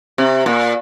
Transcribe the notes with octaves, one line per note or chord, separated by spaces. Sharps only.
C3
A#2